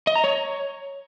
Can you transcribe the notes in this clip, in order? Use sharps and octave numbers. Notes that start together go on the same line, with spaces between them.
D#5
A#5
C#5